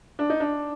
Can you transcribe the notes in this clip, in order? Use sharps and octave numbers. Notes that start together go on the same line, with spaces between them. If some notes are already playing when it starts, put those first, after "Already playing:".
D4
D#4
D4